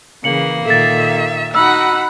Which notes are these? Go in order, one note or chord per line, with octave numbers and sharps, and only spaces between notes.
C#3 E3 A#3 C#7 F#7
A#2 D#3 A4 E5 A6
D#4 F#4 F#5 B5 E6